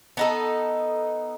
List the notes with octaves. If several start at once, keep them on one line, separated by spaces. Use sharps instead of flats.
B3 D#4 A4